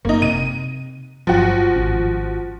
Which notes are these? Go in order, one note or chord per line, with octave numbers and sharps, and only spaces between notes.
F#1 A#3 D#4
C3 D#7
G1 F3 F#3 F#4
G#1 C#4